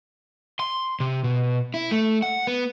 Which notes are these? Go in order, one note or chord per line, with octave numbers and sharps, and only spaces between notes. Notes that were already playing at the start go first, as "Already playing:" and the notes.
C6
C3
B2
E4
A3
F#5
B3